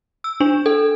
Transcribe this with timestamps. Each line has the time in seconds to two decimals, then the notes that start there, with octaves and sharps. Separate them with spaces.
0.24 E6
0.40 D4
0.66 A4